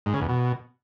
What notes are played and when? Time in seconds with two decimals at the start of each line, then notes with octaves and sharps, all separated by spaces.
0.06 G#2
0.14 C#3
0.21 E2
0.29 B2